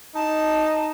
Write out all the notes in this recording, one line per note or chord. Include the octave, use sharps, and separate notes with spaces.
D#4 A5